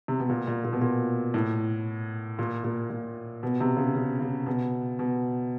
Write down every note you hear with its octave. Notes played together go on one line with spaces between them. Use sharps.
C3
B2
A#2
A#2
A#2
B2
A#2
A2
A#2
A#2
A#2
B2
C3
C#3
C#3
C#3
B2
B2